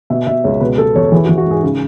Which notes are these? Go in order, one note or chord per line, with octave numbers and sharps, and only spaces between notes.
B2 E5
B2 E5
C#2 C#5
B2 B4
B2 A4
E2 C#5
E3 G#4
F#4
E3
F#4
G#2 G#4
C#3 G#4